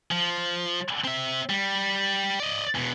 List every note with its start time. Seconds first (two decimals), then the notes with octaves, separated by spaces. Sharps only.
0.11 F3
1.04 C4 E5
1.50 G3
2.40 D5 D#5
2.75 E2 B2